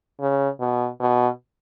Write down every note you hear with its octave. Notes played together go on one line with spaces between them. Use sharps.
C#3
B2
B2